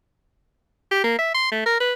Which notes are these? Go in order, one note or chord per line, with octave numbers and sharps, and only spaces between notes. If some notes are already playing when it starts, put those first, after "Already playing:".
G4
A#3
E5
C6
A3
A#4
B4